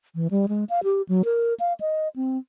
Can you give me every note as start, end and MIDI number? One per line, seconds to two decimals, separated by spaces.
0.15 0.28 52
0.31 0.46 55
0.49 0.64 56
0.70 0.83 77
0.84 1.02 67
1.09 1.22 54
1.25 1.54 70
1.60 1.73 77
1.80 2.08 75
2.16 2.38 60